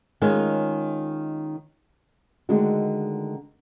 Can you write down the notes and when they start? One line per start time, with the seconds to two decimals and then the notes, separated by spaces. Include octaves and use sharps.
0.21 D#3 G#3 C#4 F4
2.49 D3 D#3 G#3 A3 D4 F#4